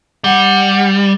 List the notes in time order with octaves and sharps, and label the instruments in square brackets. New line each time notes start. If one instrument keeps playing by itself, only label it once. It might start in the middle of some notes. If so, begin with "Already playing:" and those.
[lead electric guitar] G3 [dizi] F#5